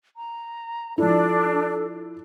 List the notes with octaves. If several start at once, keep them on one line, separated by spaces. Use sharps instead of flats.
A#5
F3 D4 E4 A4